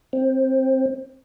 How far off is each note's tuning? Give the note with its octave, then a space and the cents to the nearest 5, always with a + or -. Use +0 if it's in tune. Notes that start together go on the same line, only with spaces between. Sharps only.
C4 +10